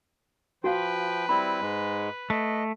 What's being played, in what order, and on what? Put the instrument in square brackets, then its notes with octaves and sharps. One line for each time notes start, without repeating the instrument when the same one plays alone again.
[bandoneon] F3 G5 [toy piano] F#4 F5 [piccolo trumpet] B4
[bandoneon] G3 C4 E4 [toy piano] B5
[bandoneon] G#2 G#3
[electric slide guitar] A3 [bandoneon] D#5